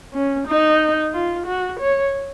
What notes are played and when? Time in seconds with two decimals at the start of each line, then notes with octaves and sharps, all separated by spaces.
0.14 C#4
0.47 D#4
1.13 F4
1.47 F#4
1.80 C#5